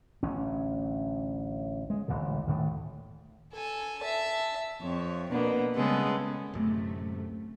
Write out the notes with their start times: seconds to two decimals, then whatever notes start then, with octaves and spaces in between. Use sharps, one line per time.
0.23 A1 D2 C#4
1.90 G#3
2.08 A1 D2 A#2 D3
2.47 D2 A2 D#3 A3
3.52 A4 G#5
4.00 E5 A5
4.81 F2 C#5
5.29 B2 A#3 B3 D4
5.75 C#3 G3 G#3 B3 G#4 A4
6.54 D1 F#2 C3 A3